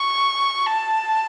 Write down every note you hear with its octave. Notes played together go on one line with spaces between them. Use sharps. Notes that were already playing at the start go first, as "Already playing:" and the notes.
Already playing: C#6
A5